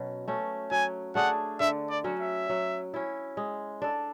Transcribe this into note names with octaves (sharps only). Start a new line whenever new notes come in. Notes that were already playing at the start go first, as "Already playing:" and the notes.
Already playing: B2 F#3 C#4
A3 C#4
F#3 G#5
A3 D4 G#4 F#5
D3 E5
D5
F#3 C#4 F#4
E5
F#3
C#4 E4
G#3
D4 A4